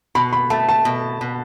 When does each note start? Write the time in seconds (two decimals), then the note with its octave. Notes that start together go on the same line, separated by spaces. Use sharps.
0.15 B2 B5
0.33 B5
0.50 A3 A5
0.69 A5
0.85 B2
1.21 B2